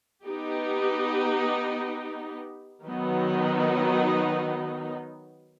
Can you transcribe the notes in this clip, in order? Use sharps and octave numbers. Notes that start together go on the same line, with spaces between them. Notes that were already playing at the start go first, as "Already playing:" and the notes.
B3 D#4 G4
D#3 F#3 B3 D#4